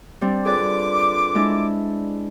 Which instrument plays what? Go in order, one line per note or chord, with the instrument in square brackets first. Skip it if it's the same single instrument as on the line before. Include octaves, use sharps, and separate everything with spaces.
[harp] G3 C4 D4
[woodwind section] D3 F4 D6 [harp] G#4 B4 D5
[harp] G#3 D4 E4